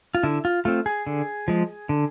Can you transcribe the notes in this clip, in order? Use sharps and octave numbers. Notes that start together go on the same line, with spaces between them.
F4
D3 E4
F4
A3 C4 F4
G#4
D3
F3 G#3
D3